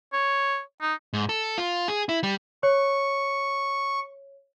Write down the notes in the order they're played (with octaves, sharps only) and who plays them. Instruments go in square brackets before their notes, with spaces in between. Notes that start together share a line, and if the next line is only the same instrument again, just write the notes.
[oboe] C#5
D#4
[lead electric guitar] G#2
A4
F4
G#4
E4
G3
[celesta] C#5 [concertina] C#6